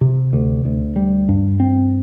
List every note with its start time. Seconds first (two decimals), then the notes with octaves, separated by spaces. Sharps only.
0.01 C3
0.33 D2
0.65 D2
0.96 G3
1.29 G2
1.60 C4